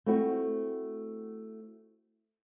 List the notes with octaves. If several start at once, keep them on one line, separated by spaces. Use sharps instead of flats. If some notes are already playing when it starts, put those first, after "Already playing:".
A3 C4 E4 F#4